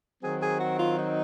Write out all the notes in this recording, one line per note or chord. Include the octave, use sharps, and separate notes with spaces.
D#3 F#3 C4 G#4
G#4
F#4
F4
D#4